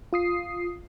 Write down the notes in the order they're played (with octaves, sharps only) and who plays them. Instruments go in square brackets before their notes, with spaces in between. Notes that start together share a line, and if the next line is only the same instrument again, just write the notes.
[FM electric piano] F4 D#6 C7